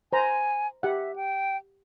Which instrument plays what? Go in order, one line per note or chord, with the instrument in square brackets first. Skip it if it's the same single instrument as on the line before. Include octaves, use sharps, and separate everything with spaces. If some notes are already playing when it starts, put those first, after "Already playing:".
[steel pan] C5 A#5 [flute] G#5
[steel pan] G4 F#5 [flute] E5
[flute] G5